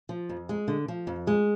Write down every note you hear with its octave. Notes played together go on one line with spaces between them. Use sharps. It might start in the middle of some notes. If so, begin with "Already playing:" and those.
F3
F2
G#3
D3
F3
F2
G#3